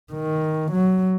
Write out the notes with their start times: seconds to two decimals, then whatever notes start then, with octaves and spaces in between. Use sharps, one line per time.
0.13 D#3
0.72 F#3